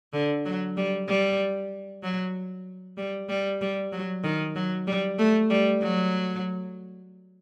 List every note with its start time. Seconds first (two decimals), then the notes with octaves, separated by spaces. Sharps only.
0.13 D3
0.45 F#3
0.77 G3
1.08 G3
2.03 F#3
2.98 G3
3.29 G3
3.61 G3
3.92 F#3
4.24 D#3
4.56 F#3
4.87 G3
5.19 A3
5.50 G3
5.82 F#3